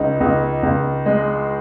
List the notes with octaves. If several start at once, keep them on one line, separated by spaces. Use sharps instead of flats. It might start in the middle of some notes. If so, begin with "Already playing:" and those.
Already playing: C#2 D#4
C#2
C#2
G#3